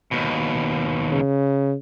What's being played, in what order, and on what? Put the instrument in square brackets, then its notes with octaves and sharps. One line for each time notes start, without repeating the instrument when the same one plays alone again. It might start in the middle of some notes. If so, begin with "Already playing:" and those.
[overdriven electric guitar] D#2 B2
[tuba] C#3